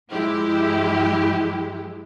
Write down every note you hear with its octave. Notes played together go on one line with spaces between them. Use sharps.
G2 F3 G#3 E4 G4